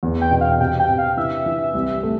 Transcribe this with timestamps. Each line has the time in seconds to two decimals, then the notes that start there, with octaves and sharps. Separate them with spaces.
0.03 E2
0.22 G5
0.31 B2
0.41 F5
0.60 C3 G5
0.80 G5
0.89 C3
0.98 F5
1.17 E3 E5
1.46 E3
1.75 C2
2.03 A3